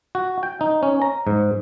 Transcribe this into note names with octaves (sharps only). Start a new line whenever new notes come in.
F#4
G5
D#4
C#4
A#5
G#2